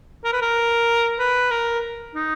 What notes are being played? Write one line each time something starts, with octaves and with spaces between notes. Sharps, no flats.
A#4
B4
A#4
B4
A#4
D#4